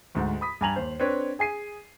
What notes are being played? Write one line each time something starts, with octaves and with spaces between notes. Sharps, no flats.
D2 G#2 F#5
B5 D#6 B6
G2 G3 G#5 A#5 F7 F#7
D#2 C5
C4 D4 B4 C#5
G#4 G#5 C7 D#7